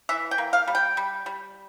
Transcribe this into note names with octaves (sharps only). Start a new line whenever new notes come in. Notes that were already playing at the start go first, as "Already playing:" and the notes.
E3 E5
G5
A#3
F5
G3
G5
G3
G3